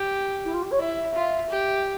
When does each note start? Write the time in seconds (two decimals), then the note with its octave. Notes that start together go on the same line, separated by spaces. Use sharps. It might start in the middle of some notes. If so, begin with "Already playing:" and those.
Already playing: G4
0.45 E4
0.53 F4
0.62 G4
0.71 C#5
0.80 E4 E5
1.14 F4
1.50 G4